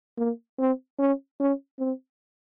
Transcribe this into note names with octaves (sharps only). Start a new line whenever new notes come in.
A#3
C4
C#4
C#4
C4